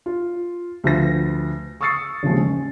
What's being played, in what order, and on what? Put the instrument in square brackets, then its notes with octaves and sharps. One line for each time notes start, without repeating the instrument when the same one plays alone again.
[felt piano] F4
D2 F3 F4 B4 A#6
C#6 D#6 E6 A6 C7 C#7
A1 D#2 C#3 F3 G#3
C#4